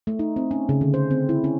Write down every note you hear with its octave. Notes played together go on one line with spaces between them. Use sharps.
A3
D#4
C4
C#4
C#3
D3
C5
C4
E4
C#4